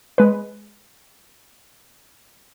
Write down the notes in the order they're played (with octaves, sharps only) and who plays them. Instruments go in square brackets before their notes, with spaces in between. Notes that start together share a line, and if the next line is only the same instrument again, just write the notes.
[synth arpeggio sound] G#3 B4